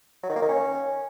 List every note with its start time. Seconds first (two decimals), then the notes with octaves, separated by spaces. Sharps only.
0.23 F#3
0.29 D#3
0.36 A#3
0.42 D#3
0.48 C#4